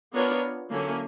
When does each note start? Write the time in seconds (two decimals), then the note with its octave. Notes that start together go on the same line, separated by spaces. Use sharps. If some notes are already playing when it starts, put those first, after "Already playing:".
0.14 B3 D4 F4 A#4 C#5
0.71 D3 F#3 A#3 C#4 E4